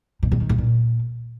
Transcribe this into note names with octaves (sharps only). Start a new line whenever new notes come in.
B2
A#2
D#3
A2
A#2